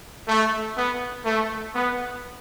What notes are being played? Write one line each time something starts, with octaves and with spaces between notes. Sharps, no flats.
A3
B3
A3
B3